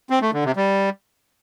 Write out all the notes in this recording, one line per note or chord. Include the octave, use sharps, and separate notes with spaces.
C4
A3
D3
C3
G3